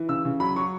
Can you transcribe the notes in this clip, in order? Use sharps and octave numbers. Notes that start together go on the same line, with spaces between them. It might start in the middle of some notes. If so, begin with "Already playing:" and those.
Already playing: E3
C#3 E6
C#3
F#3 B5
F#3 C#6